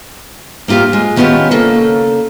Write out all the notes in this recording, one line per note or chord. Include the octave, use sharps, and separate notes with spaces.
A#3 C4 F4 G4 F5
G#3
D#3 B3 C#4 F4 G4 A5
C#3 A#3 A4